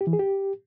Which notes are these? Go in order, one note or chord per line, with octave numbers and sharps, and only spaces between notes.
G4
E3
G#4
G4